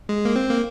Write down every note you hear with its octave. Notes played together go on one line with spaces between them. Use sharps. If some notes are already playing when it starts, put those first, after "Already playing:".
G#3
A#3
C4
A#3